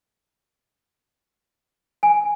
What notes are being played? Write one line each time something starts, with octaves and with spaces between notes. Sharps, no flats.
G#5